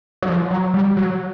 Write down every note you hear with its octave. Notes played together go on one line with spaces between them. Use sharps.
F#3
F3
F#3
G3
F#3